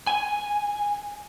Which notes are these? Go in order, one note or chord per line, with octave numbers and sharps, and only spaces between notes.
G#5